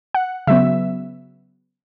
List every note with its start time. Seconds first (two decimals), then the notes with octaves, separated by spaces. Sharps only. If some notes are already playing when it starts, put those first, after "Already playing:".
0.14 F#5
0.47 C#3 F#3 B3 E5